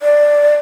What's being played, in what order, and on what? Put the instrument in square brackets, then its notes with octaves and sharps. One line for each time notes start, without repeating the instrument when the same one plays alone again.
[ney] D5